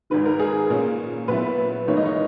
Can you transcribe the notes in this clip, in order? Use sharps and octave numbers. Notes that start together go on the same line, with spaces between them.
G#1 G#2 D#3 B4
A#4
G#4
A#2 A#3 C#4
A#2 F#3 B3 E4 B4
G#1 G#2 E3 A#3 D#4 C#5
D#5
C#5